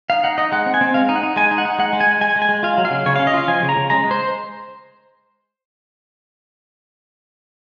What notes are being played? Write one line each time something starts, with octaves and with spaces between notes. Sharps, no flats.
D#4 F5
D#4 F#5
D#4 D#5
G#3 F#5
C4
G#5
C4
G#3 F5
D#4
F#5
D#4
G#3 G#5
D#4
F#5
D#4
G#3 F#5
G#3
G#5
G#3
G#3 G#5
G#3
G#5
G#3
F4 F5
F#3
F5
C#3
C#3 C#5
C#4 F5
D#5
F4 F5
F3 G#5
C#3
A#5
C#3
G#3 A#5
G#3
C5